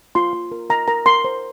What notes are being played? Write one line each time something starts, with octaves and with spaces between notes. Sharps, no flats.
F4 C6
F4
A#4
A#4 A#5
A#4 A#5
A#4 C6
C5